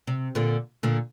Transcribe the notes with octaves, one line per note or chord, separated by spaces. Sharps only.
C3
A#2 D3
A#2 D3